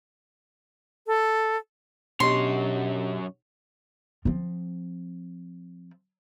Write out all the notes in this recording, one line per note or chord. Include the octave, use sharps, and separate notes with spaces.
A4
F#2 B2 D4 G4 C#5 D#5 C6
F3 C4